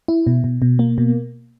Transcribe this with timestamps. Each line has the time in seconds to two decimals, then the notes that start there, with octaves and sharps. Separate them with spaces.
0.08 E4
0.27 B2
0.44 B2
0.62 B2
0.79 A#3
0.98 B2